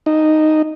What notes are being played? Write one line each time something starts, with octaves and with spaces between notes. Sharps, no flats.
D#4